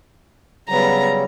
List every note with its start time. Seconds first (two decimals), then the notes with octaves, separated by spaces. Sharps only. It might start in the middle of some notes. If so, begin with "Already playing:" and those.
0.69 C#3 F#3 G3 B3 A#5